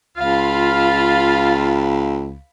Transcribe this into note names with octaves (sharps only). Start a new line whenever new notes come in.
C#2 F4 F5 B5